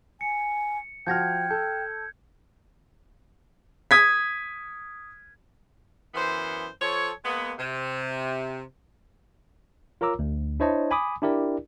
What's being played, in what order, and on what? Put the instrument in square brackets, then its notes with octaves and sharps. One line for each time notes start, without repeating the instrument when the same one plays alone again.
[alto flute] G#5 [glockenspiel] C#7
[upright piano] F3 F#4 F6 [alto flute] G5 [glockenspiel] G6 G#6 A#6
[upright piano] A4 [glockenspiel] G6
[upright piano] D#6 G#6 B6
[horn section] F#2 E3 B3 C5
F3 A4 C#5
G#3 A#3 B3
C3
[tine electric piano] F4 A#4 C#5 A#5 D6 E6
D2
D4 E4 C5 C#5 D#5 A5
G#5 B5 D6 D#6
D4 E4 G4 A#4 D5